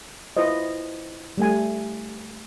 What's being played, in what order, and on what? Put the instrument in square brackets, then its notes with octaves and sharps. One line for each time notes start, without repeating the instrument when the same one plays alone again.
[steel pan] E4 F4 B4 C5 D#5
G3 A3 G#5